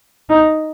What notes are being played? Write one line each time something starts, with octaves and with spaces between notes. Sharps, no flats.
D#4